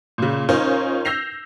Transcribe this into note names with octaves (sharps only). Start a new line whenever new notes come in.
A#2 C#3
C#4 D#4 F4 A#4 C5
E6 G6 A#6 C7 F7